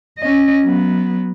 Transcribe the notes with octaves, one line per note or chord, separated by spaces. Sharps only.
C#4 D#5
F#3 B3